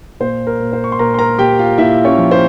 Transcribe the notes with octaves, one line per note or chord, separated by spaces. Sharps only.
A#2 C5
A#4
A#2
C5
C#6
C6
A#2 A#4 A#5
C6
A#4 A#5
A#2 G4 G5
F4 F5
A#2 E4 E5
C#4 C#5
F3
C5